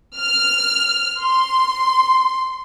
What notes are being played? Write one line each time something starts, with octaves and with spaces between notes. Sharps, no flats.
F6
C6